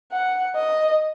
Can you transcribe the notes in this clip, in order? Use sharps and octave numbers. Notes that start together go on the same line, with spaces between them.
F#5
D#5